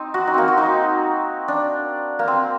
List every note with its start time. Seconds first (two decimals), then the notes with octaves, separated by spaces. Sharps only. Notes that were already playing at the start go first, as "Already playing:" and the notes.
Already playing: C4 D#4
0.14 F#4
0.27 D#4
0.34 A#3 C4
0.48 F#4
0.58 D#4
1.48 D4
2.19 A#3
2.28 C4